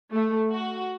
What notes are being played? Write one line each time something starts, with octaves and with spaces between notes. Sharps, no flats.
A3
F#4